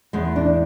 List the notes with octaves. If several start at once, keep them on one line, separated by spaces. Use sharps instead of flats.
E2 G#3
D4